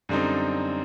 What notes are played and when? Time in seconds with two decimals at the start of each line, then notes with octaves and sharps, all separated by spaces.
0.09 F#2 D3 G3 C4 D#4